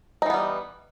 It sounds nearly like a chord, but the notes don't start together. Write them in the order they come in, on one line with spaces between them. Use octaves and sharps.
D#4 E3 B3 G3